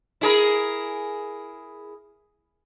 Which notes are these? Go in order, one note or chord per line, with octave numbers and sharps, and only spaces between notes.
E4 G#4 A#4